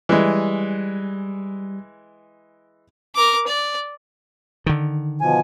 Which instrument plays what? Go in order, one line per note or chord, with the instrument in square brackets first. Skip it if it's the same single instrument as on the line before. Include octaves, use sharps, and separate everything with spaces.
[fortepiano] E3 G#3 [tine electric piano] G3
[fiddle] A#4 D6
D5
[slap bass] D3 D#3
[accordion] B2 F3 G#5